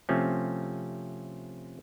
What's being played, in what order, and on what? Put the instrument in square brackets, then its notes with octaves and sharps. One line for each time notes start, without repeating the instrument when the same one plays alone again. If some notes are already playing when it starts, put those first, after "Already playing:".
[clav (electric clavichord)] C3 F3 A3 C4 C#4